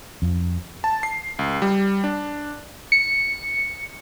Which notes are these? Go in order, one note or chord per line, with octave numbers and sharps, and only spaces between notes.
F2
A5
C7
C#2
G3
D4
C#7